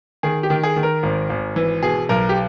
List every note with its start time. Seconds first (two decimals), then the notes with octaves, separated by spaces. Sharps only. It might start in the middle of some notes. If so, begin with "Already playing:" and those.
0.23 D#3 G#4
0.43 G4
0.50 D#3
0.63 G#4
0.76 D#3
0.83 A#4
1.03 G#1
1.29 G#1
1.56 E3
1.83 B2 G#4
2.09 B1 A#4
2.29 G4